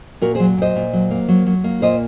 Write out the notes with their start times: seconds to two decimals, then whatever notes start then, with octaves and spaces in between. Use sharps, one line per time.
0.21 A#2 F#4 A#4
0.35 G#4 C5
0.40 F#3
0.58 A#2 C5 D#5
0.76 A#2
0.93 F#3
1.11 A#3
1.28 F#3
1.46 F#3
1.64 A#3
1.82 A#2 C5 D#5